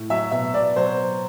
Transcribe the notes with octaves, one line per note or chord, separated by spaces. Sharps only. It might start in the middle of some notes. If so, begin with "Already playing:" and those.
Already playing: A2
F#3 E5
B2 E5
B2 D5
F#3 C5